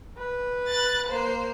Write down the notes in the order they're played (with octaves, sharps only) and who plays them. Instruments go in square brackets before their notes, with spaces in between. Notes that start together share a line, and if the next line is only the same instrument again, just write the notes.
[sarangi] B4
[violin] F#6 A6
A#3 C5